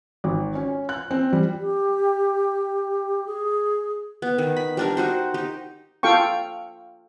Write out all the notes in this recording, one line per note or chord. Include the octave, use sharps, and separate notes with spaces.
G#1
C#4
F#6
C4
G3
G4
G#4
B3
D#3
B5
G3 D4 A#4
D#4 F#4 C5
D#4 G4
F4 A4 F5 G5 C#6